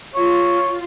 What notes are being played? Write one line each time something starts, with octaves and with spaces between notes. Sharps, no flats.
F4 C#5